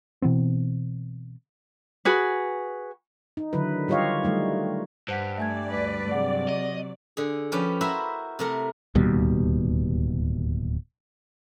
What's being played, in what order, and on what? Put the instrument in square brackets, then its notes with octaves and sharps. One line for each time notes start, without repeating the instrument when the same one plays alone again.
[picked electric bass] B2 E3 B3 C4
[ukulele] F#4 G#4 B4
[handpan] D#4
D3 D#3 F#3 E4 B4
G3 F4 G4 C#5 D#5 F5
F#3 G3 A3 D#4
[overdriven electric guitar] G2 [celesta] C5 F#5 B6
[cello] A3 [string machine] D5 [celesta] E5 G#5 G#6
[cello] D2 B4
[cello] C3 F#3 [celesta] G#4 F#5
[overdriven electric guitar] D#5
[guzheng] D3 G#4
F3 C#4 G4 B4
E4 F#4 A#4 C5 E5 B5
C3 A3 A#4
[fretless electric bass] D1 D#2 B2 G3